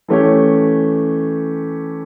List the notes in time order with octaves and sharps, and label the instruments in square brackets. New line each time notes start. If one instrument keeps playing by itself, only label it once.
[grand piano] E3 A3 C#4 G4 C#5